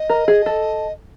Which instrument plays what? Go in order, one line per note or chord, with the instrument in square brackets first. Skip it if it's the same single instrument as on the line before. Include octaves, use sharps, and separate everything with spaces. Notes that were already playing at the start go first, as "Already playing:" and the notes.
Already playing: [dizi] D#5
[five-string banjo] A#4
G#4
A4